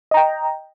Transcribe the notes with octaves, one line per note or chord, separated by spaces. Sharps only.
D#5 G5 A#5